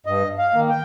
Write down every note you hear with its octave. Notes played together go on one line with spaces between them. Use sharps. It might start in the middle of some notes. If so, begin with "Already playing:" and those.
G2 D#5
F5
D#3 A#3
G5